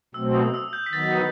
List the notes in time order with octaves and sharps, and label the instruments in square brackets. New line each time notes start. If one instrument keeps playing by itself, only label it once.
[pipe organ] B2 F#3 A3 C4 [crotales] E6
[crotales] D#6
E6
G6
B6
[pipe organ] D#3 F#3 B3 D#4 [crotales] A6